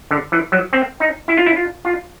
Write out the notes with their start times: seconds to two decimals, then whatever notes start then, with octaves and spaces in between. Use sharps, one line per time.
0.11 D3
0.32 E3
0.52 F#3
0.73 C4
1.00 D#4
1.28 E4
1.37 F4
1.46 E4
1.56 F4
1.85 F4